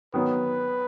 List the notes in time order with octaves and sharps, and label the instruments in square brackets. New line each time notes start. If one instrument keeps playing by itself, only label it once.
[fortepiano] D#3 F#3 B3 [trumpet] B4